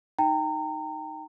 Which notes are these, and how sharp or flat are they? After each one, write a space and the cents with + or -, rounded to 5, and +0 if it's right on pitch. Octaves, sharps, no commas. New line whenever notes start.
D#4 +0 G5 +0 A#5 -30